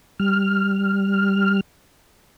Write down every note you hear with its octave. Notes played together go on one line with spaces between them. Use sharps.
G3 F6